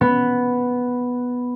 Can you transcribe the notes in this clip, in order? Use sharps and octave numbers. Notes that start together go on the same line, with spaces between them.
B3